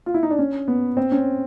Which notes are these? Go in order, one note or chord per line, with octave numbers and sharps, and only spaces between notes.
F4
E4
D#4
D4
C#4
B3
C4
C#4